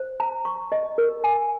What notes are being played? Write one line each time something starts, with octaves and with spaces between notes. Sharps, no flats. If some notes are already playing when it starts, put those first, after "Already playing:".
Already playing: C5
A#5
C#6
D#5
A#4
G#5